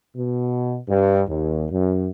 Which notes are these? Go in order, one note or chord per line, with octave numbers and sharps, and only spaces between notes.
B2
G2
D#2
F#2